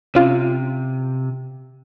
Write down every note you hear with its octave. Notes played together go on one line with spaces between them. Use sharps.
C3 C#4 F4